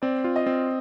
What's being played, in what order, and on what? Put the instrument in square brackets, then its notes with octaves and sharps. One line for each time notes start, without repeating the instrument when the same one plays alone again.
[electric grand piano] C4 [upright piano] D5
[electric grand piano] F4
[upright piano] D#5
[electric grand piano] C4